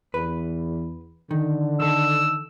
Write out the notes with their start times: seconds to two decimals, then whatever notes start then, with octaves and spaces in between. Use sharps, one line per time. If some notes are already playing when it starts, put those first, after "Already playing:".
0.14 E2 B4
1.31 D3 D#3
1.80 D#3 A4 E6